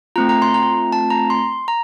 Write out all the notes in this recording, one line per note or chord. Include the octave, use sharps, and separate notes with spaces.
A3 C4 F4 A#5
A#5
C6
A#5
A5
A#5
C6
A#5